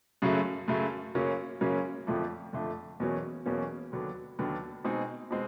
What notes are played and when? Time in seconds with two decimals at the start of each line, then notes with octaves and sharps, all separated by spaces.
0.22 F#2 C#3 F#3 A3
0.68 F#2 C#3 F#3 A3
1.15 F#2 C#3 F#3 A#3 C#4
1.61 F#2 C#3 F#3 A#3 C#4
2.07 F2 D3 F3 A3 D4
2.53 F2 D3 F3 A3 D4
3.00 E2 B2 F#3 A#3 C#4
3.46 E2 B2 F#3 A#3 C#4
3.92 D#2 D3 F#3 B3 D4
4.39 D#2 D3 F#3 B3 D4
4.85 B2 G#3 C4 D#4 G#4
5.31 B2 G#3 C4